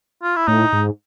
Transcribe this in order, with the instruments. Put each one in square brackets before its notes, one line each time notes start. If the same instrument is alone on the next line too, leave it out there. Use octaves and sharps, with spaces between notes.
[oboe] F4
E4
[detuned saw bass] A2 [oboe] D#4
[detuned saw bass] G#2